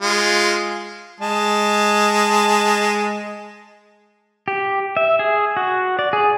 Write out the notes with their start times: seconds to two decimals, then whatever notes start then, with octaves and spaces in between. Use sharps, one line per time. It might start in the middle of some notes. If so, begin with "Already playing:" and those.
0.02 G#3 F4
1.20 G#3 A5
4.48 G4
4.97 E5
5.19 G#4
5.57 F#4
5.99 D5
6.13 G#4